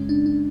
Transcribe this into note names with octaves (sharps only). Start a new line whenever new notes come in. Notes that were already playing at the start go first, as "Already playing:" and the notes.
Already playing: F#2 C#3 G#3 C#4
D4
D4